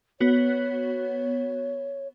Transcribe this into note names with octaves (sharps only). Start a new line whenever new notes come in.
B3 F#4 C#5